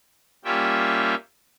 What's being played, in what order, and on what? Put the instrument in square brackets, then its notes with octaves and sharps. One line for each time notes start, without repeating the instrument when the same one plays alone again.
[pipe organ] G3 A#3 C#4 F4 E5 G5